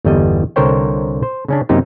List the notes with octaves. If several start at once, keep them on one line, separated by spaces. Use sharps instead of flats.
G1 E2 G3 D#5
C2 D3 A#4 C5 C#5 G5
C5
C#3 C#4 D4
F#2 C3 A#3 D#4 G4